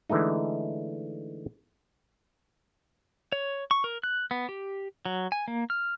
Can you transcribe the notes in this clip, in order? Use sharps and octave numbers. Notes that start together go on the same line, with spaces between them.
D3 E3 G#3 A3 D#4
C#5
C#6
A#4
F#6
B3
G4
F#3
G#5
A#3
F6